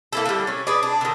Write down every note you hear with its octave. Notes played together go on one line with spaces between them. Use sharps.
A#3 E4 A4
D3 G3
C#4
G#4 B4 D5
D4
D3 D#3